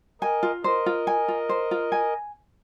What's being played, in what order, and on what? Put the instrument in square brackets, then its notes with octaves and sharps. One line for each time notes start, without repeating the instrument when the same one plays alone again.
[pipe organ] A#4 D#5 [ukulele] G#5
[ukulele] F4
[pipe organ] A#4 D#5 [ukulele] C5
[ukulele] F4
G#5
F4
C5
F4
G#5